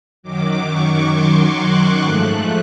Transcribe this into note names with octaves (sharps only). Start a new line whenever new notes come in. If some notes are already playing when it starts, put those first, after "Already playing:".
F#2 D#3 F#3 D6
C#6
C6
F#6
G#2 F3 A3